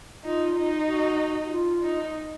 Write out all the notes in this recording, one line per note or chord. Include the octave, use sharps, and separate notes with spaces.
D#4 F4
D#4
F#4
F#4
F4
D#4